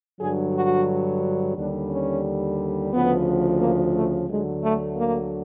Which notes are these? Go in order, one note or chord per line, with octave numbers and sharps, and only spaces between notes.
G2 D3 F#3 G#4
F#4
D#2 D3 G3 D4
C#4
D2 C#3 F3 B3
A#3
A3
D2 D3 F#3 G#3
A3
A#3